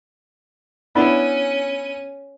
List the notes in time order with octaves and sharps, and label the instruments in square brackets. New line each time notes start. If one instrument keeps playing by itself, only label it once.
[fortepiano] B3 D4 E4 [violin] C#4 D#7